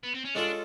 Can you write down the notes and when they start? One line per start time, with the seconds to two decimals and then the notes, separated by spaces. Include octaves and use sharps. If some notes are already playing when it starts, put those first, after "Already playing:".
0.03 B3
0.14 C4
0.25 C#4
0.35 G#3 C#4 D4 F4 A4 C#5